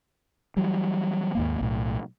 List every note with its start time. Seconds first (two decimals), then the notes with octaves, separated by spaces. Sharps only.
0.57 E3 F#3 G3
1.35 D#2 G#2 A#3
1.61 B1 A2